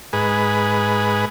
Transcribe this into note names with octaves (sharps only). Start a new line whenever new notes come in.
G#2 G#4 B4